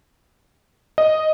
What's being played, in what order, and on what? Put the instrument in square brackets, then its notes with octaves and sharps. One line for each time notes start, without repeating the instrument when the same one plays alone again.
[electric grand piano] D#5